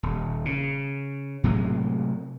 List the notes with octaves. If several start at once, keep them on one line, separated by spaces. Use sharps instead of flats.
D#1
C#3
A2 C3 F#3 G#3